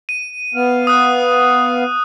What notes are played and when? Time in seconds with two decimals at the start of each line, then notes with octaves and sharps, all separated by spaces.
0.09 D#7
0.54 B3 F5
0.87 D#6 F#6